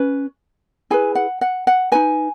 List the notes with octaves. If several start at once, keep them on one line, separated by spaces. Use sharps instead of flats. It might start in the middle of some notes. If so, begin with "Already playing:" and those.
Already playing: C#4 B4
E4 G#4 B4 G#5
F#5
F#5
F#5
D#4 F#4 B4 G#5